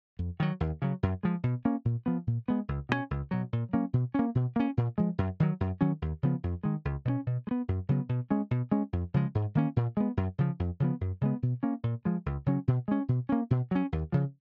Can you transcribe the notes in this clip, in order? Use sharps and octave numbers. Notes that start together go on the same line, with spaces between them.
F2
D#3 F#3
D#2
C#3 F#3
F#2
F3 G#3
B2
A#3 C#4
A#2
F3 B3
A#2
G#3 B3
C#2
B2 F#3 C#4
C#2
B2 F#3
A#2
F#3 A#3 C#4
B2
A#3 C#4
B2
A#3 C#4
A#2
F3 G#3
F#2
D#3 F#3
F#2
D#3 F#3 C#4
D#2
C#3 F3 B3
F2
D#3 G#3
C#2
B2 A#3 C#4
B2
G#3
B3
F#2
C#3 F#3 B3
B2
G#3 C#4
B2
G#3 C#4
F2
C#3 F3 G#3
G#2
D#3 A#3 C#4
A#2
G#3 B3
F#2
C#3 F3
F2
C#3 F3 B3
F#2
C#3 G#3 B3
B2
A#3 C#4
A#2
F3 G#3
C#2
C#3 F#3 C#4
B2
G#3 C#4
B2
A#3 C#4
B2
F#3 C#4
D#2
C#3 F3